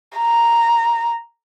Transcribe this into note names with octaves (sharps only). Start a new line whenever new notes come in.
A#5